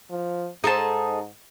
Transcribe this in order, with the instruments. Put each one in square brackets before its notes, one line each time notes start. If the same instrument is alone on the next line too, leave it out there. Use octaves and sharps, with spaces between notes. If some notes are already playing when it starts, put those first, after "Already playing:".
[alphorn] F3
[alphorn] G#2 [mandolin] D#4 A5 [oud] G#4 A4 C5